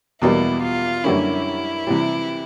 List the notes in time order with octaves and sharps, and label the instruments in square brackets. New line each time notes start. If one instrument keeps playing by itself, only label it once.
[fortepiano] E2 B2 G3 A#3 [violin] E4
[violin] F4
[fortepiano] F#2 D3 G3 A#3 C#4 [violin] E4
[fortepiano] C3 E3 G3